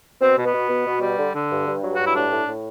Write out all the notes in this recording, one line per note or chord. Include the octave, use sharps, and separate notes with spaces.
B2 C4
B2
B3
B2
B2
B2
G3
D3
D3
G2
G2
F#3
G2 F#4
E4
A2 D4
A2
A2